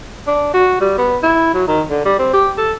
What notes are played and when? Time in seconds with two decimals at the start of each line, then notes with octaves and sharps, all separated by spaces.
0.27 D4
0.53 F#4
0.80 G3
0.98 B3
1.23 E4
1.54 F#3
1.67 D#3
1.90 D3
2.05 G3
2.19 C4
2.33 G4
2.57 A4